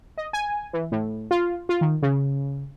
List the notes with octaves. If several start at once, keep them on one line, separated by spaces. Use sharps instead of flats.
D#5
G#5
E3
A2
F4
F4
D#3
C#3